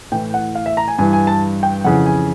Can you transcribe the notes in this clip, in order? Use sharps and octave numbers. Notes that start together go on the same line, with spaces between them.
A2 E3 G5
F#5
F5
E5
A#5
G#5
G2 E3 G#5
G#5
A5
G5
F2 C#3 E3 F#5
G#5